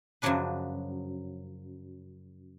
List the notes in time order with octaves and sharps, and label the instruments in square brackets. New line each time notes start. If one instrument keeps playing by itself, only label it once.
[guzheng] F#2 C#3 F3 F#3 D4 B4